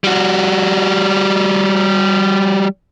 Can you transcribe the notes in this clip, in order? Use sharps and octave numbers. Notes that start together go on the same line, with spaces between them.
G3 F#4